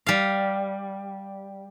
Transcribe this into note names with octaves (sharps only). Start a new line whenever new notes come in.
G3 F5